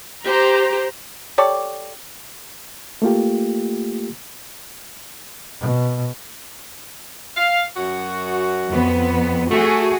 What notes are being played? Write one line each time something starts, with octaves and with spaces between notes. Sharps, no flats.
G4 C5 A#5
G4 A4 C#5 D5
A3 A#3 F4 G4
B2
F5
F#2 F#4
F2 B3
A3 F#4 G#4